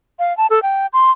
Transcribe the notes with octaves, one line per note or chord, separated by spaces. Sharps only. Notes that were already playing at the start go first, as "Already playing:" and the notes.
F5
A5
A4
G5
C6